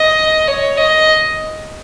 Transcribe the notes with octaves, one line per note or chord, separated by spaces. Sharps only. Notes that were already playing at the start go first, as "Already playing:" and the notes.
Already playing: D#5
C#5
D#5